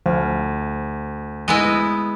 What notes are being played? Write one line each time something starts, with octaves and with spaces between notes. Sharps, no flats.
D2 F3
G#3 B3 E4 D#5